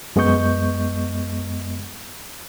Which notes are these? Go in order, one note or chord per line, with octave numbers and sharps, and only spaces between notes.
F#2 G#3 B3 D#5 C#6 G6